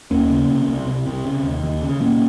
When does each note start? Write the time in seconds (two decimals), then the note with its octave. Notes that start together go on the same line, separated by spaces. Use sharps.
0.11 D#2 A#3 C#4
0.30 C#3
0.49 C3
0.68 C2
0.87 C2
1.06 C3
1.25 C#3
1.43 D#2
1.64 D#2
1.81 C#3
2.01 A#2 A#3 C#4